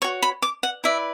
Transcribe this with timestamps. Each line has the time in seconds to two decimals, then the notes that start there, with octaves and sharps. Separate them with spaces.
0.02 F#4 C#5 C#6
0.22 B5
0.42 D6
0.63 F#5
0.84 E4 B4 D5 E5